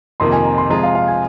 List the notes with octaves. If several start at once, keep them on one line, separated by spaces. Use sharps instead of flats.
F2 C3 D#3 A#3 C6
G#5
A#5
C6
C3 F3 G#3 F4 G#4 A#5
F5
F5
G#5